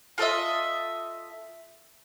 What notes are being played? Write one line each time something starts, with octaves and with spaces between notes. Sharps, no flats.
F4 A4 D#5 E5